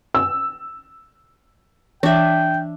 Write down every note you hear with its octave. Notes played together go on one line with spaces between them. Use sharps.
E6
E3 D4 E5 G5